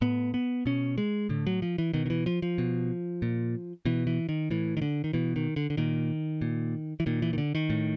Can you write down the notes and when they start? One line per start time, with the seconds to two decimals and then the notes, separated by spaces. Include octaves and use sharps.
0.01 A2 B3
0.34 B3
0.66 B2 C#4
0.98 G#3
1.29 A2 D3
1.47 F#3
1.62 F3
1.78 E3
1.94 B2 D#3
2.06 D#3
2.10 E3
2.26 F3
2.42 F3
2.58 B2
3.22 A#2
3.85 B2 E3
4.07 E3
4.29 D#3
4.50 A2 E3
4.77 D#3
4.82 D3
5.04 D#3
5.13 B2 E3
5.36 D#3
5.56 D3
5.70 D3
5.77 A#2 D#3
6.42 A#2
7.00 E3
7.06 A#2 D#3
7.22 E3
7.33 D#3
7.38 D3
7.55 D#3
7.70 A2